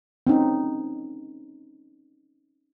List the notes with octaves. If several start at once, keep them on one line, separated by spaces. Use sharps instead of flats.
C4 C#4 D#4